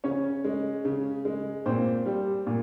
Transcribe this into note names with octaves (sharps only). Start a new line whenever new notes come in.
C#3 C#4 C#5
G#3
C#3
G#3
A#2 C4 C5
G3
A#2